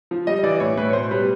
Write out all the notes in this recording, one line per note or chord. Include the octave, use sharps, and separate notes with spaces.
F3
G3 D#5
E3 D5
A2 C#5
A2 B4
C#5
B2 C5
G3 B4